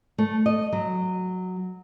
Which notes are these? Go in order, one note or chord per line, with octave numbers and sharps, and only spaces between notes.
A3
D#5
F#3